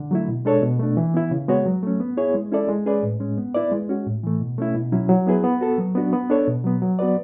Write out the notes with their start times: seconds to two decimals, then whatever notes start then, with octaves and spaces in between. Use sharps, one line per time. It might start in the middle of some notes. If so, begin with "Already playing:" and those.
Already playing: D3
0.11 F#3 A3 E4
0.28 B2
0.45 G#3 D4 A4 C#5
0.62 B2
0.79 A3 D4
0.97 E3
1.14 B3 E4
1.31 C#3
1.49 G#3 B3 F#4 C#5
1.66 F#3
1.83 A3 C#4
2.00 B3
2.17 E4 G#4 C#5
2.34 G#3
2.52 C#4 E4 A4 D5
2.69 G#3
2.86 C#4 G#4 B4 D5
3.03 A2
3.20 G#3 C#4
3.37 B3
3.55 E4 B4 D5
3.71 G#3
3.89 C#4 F#4
4.06 A2
4.23 E3 A3
4.40 B2
4.58 A3 C#4 E4
4.75 B2
4.92 F#3 C#4 E4
5.09 F#3
5.27 B3 E4 G#4 B4
5.44 B3
5.61 F#4 A4
5.78 F#3
5.95 B3 D4 F#4
6.13 B3
6.30 D4 A4 C#5
6.47 B2
6.64 F#3 B3
6.82 F#3
6.99 B3 F#4 B4 D5